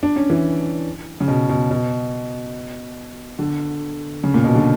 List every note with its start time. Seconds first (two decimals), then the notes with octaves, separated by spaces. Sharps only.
0.03 D4
0.16 C#4
0.30 E3
1.20 C#3
1.28 B2
1.49 B2
1.71 B2
3.39 D3
4.24 C#3
4.34 A#2
4.44 B2
4.55 D3